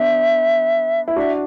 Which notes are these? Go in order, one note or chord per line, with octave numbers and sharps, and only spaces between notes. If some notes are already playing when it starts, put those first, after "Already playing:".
Already playing: B3 D4 E5
E4
D4 F#4 E5